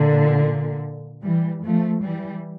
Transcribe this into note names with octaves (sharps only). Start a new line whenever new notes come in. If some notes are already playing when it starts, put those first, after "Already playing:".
Already playing: A#2 D3
E3 G3
F3 A3
E3 G3